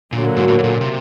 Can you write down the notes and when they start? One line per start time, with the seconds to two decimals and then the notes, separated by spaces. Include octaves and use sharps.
0.12 A#2 D3 F#3 A#3
0.36 G#2
0.48 A2
0.59 A2
0.64 A#2
0.81 C3